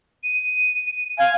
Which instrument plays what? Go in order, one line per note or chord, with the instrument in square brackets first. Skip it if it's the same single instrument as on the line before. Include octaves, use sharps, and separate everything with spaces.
[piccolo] D#7
[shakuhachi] F5 [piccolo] G#5